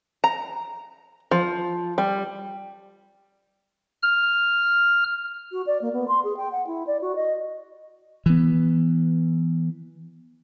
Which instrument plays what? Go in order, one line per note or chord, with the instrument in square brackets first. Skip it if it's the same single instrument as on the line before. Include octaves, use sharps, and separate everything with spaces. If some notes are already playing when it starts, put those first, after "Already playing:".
[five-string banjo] A#5
F3
G3
[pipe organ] F6
[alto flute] F#4
D5
A#3
B3
C6
G#4
G5
F#5
E4
D5
F#4
D#5
[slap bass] E3 B3